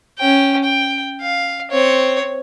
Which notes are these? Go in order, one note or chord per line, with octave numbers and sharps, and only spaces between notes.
C#4 G5
G5
F5
C4 C#5